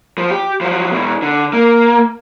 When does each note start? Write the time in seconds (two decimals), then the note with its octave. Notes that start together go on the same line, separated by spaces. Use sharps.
0.18 F3
0.30 G4
0.61 F3 F#3
0.92 B2 E3
1.22 D3
1.53 A#3